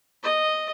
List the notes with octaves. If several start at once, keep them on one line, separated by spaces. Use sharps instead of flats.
D#5